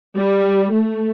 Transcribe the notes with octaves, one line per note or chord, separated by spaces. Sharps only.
G3
A3